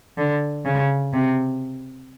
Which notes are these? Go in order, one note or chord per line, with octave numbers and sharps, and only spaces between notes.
D3
C#3
C3